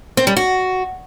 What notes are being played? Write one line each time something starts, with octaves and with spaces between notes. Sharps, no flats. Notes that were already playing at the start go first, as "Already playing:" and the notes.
C4
G3
F#4